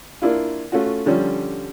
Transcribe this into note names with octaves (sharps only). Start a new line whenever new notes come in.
A#3 D4 E4 F4
A3 C#4 F4 F#4
D3 F3 G3 C#4